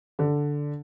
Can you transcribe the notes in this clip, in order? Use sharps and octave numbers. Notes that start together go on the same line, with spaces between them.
D3